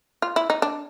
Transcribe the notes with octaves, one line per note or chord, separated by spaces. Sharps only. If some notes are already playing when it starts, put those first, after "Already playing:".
F4
E4
D#4
D4